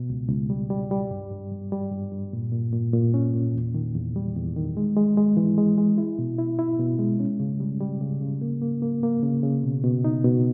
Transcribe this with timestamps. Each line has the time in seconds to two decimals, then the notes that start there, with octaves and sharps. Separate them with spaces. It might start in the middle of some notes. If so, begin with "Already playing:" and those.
Already playing: B2
0.10 C#2
0.29 C#2
0.50 G3
0.70 G3
0.91 G3
1.11 G2
1.32 G2
1.51 G2
1.72 G3
1.91 G2
2.12 G2
2.33 A#2
2.52 A#2
2.73 A#2
2.93 A#2
3.14 C#4
3.33 A#2
3.55 E2
3.74 D#3
3.94 E2
4.16 G3
4.36 E2
4.56 D#3
4.77 G#3
4.96 G#3
5.17 G#3
5.37 E3
5.58 G#3
5.78 G#3
5.98 E4
6.19 B2
6.38 E4
6.59 E4
6.80 B2
6.99 G#3
7.20 C#4
7.40 C#3
7.60 G3
7.80 G3
8.01 C#3
8.21 C#3
8.41 A#3
8.61 A#3
8.82 A#3
9.03 A#3
9.23 C#3
9.43 C#3
9.64 B2
9.83 B2
10.04 D#4
10.24 B2